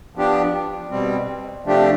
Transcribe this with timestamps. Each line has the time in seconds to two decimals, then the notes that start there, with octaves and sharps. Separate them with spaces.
0.16 F3 B3 D4 G4
0.90 B2 G3 C4
1.65 C3 F3 A3 D4 G4